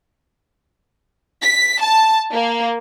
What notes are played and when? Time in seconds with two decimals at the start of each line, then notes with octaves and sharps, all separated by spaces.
1.43 B6
1.81 A5
2.34 A#3